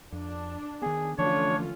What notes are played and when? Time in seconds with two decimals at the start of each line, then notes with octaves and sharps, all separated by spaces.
0.12 F2 D4
0.82 D#3 B3 G#4
1.18 D3 E3 F3 A3 C#4 D4 F4 C#5